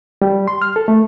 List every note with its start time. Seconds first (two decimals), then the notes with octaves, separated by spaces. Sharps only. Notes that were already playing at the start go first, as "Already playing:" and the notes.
0.22 G3
0.48 C6
0.62 F6
0.76 A4
0.88 A3